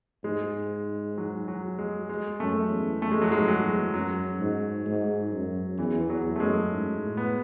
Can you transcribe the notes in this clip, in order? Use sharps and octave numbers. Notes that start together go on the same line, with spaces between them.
G#2 G#3
F#3
F#3
G#3
G#3
F#2 A3
E2
F#2 A3
G#3
F#3
G#2 G#3
F#3
E2
F#2 F#3
G#2
G#2
F#2
E2 E3
E2 F#3
A3
F#2 G#3
G#2
A2
B3